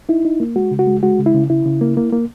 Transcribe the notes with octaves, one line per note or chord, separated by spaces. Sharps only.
D#4 E4
D#4
A#3
G#3 F#4
C#3
F#4
G#3
G#3 F#4
C#3
E4
C#3
C#3 E4
C#3
A#3
A#3
A#3